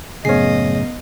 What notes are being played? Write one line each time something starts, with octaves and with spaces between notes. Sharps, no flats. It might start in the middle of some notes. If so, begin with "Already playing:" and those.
F#2 A2 C#3 B3 G#4 C#5 D#5 C7